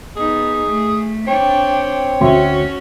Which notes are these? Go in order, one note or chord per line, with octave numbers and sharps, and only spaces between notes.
B3 D#4 G#4
A3
C4 D4 C#5 G5
D2 C#4 F#4 E5 C6